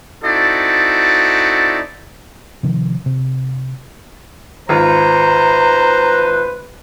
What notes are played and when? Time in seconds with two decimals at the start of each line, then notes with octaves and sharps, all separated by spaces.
0.23 C4 D#4 E4 F#4 A4 D5
2.63 C3 D#3 F3
3.06 C3
4.69 G#1 F4 B4 C5 A#5